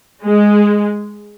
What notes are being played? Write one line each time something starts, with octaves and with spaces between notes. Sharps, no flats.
G#3